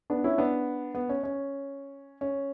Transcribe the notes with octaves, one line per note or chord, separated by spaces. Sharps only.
B3 D4
C#4 E4
B3 D4
B3
C#4
C#4
C#4